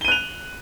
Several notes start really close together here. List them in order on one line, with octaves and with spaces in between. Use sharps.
G7 D#7 F#6 F7